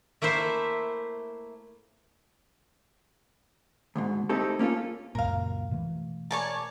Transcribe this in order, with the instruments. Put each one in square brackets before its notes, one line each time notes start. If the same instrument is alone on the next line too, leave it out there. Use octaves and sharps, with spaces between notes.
[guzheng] A3 A#3 E4 C5 E5
[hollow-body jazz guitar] D2 G#2 B2
A3 C4 D#4 E4 G4 A4
A#3 C#4 E4 F4 A4
[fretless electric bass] C#2 F#2 A#2 [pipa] A#4 F5
[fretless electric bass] B2 E3 A3
[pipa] A#4 G#5 [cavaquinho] C#5 D5 A5